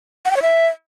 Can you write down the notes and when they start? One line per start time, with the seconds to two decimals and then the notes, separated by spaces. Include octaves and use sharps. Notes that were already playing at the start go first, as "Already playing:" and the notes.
0.25 F#5
0.31 G5
0.36 C#5
0.42 E5